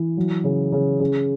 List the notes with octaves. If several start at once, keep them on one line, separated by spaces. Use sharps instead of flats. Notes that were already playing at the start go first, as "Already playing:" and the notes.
Already playing: E3
F#3
C#3
C#3
C#3